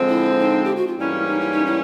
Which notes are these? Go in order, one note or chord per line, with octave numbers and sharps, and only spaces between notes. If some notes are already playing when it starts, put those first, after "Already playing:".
Already playing: D3 F3 G#3 C4
E4
D#4
G4
F#4
F4
G#2 E3 G3 A#3 C#4 E4
D#4
E4
D#4
E4